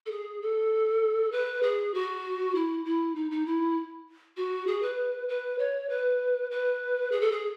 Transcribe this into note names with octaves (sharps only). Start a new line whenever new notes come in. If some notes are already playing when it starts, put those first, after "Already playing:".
A4
G#4
A4
B4
G#4
F#4
E4
E4
D#4
D#4
E4
F#4
G#4
B4
B4
C#5
B4
B4
G#4
A4
G#4